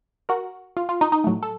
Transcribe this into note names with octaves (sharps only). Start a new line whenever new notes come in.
F#4 A#4
F4
F4
D#4
D#4
A2 F#3 A3
A4